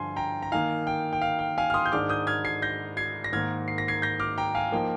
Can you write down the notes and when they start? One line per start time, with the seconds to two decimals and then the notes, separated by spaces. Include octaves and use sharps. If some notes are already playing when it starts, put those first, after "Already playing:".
Already playing: G2 D3 F3 G#5 C6
0.16 G5 A#5
0.42 A#5
0.52 D#3 A#3 D#4 F5 G#5
0.87 G5
1.13 G5
1.22 F5
1.39 G5
1.58 F5 G#5
1.70 F6
1.74 C6 D#6
1.86 G6
1.92 G#2 D#3 G#3 D4 D6 F6
2.09 D#6 G6
2.27 F6 G#6
2.45 G#6 C7
2.62 G6 A#6
2.97 G#6 C7
3.24 A#6
3.32 G#2 D#3 A#3 F6 G#6
3.68 C7
3.78 A#6
3.88 G#6 C7
4.02 G6 A#6
4.20 D6 F6
4.38 G5 A#5
4.55 F5 G#5
4.72 F3 A#3 D#4 G5